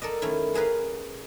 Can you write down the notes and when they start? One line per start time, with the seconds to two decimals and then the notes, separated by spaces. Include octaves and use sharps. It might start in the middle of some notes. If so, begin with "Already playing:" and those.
0.02 A4 A#4 D5 D#5
0.22 D#3 A3 C#4 E4
0.54 C#4 G#4 A#4 B4 F5